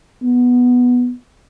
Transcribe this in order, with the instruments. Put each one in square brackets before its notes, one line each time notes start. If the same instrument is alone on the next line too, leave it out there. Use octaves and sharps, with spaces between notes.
[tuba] B3